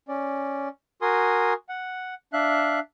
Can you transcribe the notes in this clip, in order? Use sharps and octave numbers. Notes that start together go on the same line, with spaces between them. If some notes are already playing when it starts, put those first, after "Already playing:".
C#4 D5
F#4 A#4 G#5 C6 D#6
F#5
D4 E5 F5 F#6